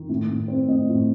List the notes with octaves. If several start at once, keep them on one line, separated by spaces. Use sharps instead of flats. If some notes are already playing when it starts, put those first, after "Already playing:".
Already playing: D#3
A2
A2
C4
A2 D#5
A2